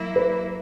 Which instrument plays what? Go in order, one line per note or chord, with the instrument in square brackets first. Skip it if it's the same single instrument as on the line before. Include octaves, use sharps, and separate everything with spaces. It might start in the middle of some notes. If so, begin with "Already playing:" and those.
Already playing: [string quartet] F#3 A#3 E4
[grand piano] B4